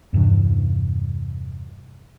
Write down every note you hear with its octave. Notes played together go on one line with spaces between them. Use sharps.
E2 G2 C3 E3